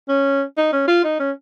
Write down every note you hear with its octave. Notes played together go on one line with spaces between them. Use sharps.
C#4
D#4
C#4
F4
D#4
C#4